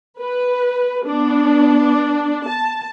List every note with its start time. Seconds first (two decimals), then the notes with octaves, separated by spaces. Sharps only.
0.19 B4
1.06 B3 D4
2.48 A5